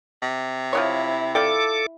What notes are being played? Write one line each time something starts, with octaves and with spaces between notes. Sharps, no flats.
C3
F3 B3 E4 C#5
F4 A4 D5 G5 D6